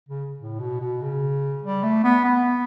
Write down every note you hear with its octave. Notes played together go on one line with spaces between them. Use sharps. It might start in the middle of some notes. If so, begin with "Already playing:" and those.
C#3
A2
B2
B2
C#3
G3
A3
B3
B3